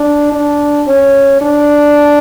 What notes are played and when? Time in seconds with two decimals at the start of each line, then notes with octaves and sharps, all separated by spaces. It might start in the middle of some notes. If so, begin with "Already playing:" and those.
Already playing: D4
0.32 D4
0.87 C#4
1.42 D4